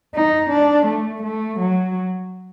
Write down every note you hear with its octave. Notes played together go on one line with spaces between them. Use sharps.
D#4
D4
A3
A3
F#3